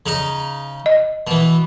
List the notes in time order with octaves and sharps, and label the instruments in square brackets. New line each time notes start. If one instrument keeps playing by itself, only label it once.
[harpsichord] C#3 D#4 D#5
[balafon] D#5
[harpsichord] B2 E3